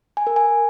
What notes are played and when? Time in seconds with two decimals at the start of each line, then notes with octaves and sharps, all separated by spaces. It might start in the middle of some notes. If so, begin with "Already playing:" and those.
0.17 G#5
0.27 A#4
0.36 G#5